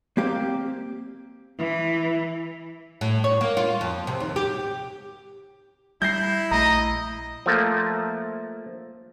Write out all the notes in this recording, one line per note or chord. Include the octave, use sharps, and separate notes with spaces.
A#3 C4 G4 F5
E3
A2
C#5
A#3
F4
F2
C3
D#2
G4
G3 E4 G6 A#6 C7
A#1 A3 D#5 A#5
F3 A3 A#3